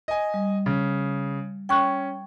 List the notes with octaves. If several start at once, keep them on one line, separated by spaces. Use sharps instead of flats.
D#5 G#5
G3
C#3
C#4 G5 C#6 F#6